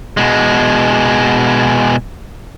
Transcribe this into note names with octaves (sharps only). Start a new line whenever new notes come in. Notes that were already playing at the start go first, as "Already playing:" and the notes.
B2 G#3